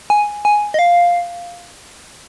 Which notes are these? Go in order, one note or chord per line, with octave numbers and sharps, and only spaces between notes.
G#5
G#5
D#5
F5